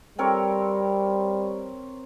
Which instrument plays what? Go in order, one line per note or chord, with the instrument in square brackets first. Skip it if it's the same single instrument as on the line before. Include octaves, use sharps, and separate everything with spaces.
[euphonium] G3 [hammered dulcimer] C4 A#4 C#5